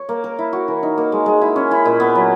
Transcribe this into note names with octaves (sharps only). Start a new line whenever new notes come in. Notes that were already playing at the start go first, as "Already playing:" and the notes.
Already playing: C#5
A#3
A#4
E4
F#4
E3
D#4
A#3
G#3
G#3
E4
C#4
E4
A#2
B3
F#3